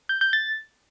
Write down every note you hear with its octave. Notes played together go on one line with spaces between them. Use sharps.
G6
G6
A6